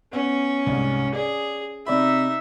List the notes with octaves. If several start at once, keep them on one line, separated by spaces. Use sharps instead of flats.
B3 C#4
C2 G#2
G#4 D5
C3 D#4 D5 E5 B5